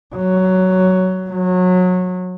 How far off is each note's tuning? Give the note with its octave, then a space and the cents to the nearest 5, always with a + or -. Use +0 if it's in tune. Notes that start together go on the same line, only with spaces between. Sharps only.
F#3 +10
F#3 -25